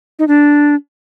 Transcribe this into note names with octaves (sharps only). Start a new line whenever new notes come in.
D#4
D4